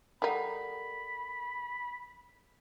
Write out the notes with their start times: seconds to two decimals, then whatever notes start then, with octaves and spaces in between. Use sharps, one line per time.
0.22 G3 D#4 A4 A#4 F#5 B5